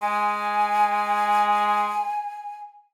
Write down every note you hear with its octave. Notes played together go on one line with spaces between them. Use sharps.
G#3 G#5